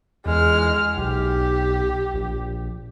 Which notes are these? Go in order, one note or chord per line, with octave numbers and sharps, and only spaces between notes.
E2 G#3 F6
B1 G4
A#1